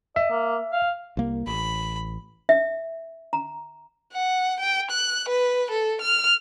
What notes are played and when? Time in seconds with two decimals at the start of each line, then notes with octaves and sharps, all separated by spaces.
0.16 D#5 E5
0.30 A#3
0.72 F5
1.17 C2 A#3
1.47 A1 B5
2.49 E5
3.33 A#5
4.13 F#5
4.60 G5
4.91 F#6
5.29 B4
5.71 A4
6.02 F6